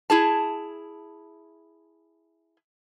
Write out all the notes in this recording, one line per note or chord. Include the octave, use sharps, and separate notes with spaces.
E4 G#4 A5